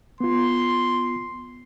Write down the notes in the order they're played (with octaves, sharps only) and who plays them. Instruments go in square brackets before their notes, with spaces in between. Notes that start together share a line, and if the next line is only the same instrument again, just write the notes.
[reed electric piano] B3 F4 [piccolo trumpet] C6